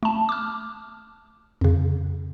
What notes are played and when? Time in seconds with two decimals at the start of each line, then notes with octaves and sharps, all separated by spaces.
0.03 A3 A5
0.29 D6 F6
1.61 F2 C#3